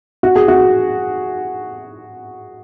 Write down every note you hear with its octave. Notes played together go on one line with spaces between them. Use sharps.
F#4
G#4
F#4